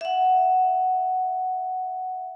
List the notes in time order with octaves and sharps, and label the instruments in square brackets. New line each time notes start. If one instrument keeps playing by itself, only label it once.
[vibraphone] E5 F#5